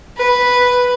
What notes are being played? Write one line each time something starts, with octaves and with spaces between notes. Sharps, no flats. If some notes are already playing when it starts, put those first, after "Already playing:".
B4